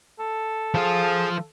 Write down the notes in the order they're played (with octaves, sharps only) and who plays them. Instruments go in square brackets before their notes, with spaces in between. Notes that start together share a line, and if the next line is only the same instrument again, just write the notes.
[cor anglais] A4
[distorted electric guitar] F3 F4 [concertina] G#4 F5